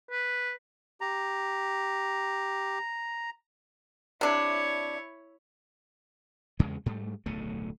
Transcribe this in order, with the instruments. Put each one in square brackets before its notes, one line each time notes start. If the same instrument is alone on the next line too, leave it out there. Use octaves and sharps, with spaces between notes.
[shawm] B4
[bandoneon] G4 [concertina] A#5
[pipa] C3 D4 [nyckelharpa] E4 C#5
[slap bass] E2 G2 C#3 G#3
G#2 G3 A3
D1 B1 C#3 A3